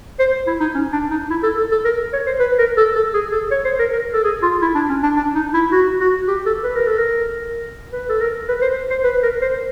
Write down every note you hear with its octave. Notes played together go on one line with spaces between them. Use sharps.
C5
E4
D#4
C#4
D4
D#4
E4
A4
A4
A4
A#4
C#5
C5
B4
A#4
A4
A4
G#4
A4
C#5
C5
A#4
A#4
A4
G#4
F4
E4
D4
C#4
D4
D4
D#4
E4
F#4
F#4
G4
A4
B4
A#4
A4
A#4
B4
A4
A#4
B4
C5
C5
B4
A#4
C5